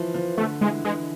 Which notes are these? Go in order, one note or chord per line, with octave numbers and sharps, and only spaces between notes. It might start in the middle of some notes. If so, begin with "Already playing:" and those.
Already playing: E3 F3
F3
D3 A3
E3 G#3
E3 G#3